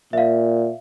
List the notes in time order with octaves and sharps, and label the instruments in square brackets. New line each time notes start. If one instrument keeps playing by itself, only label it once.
[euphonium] A#2 [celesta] E5 F5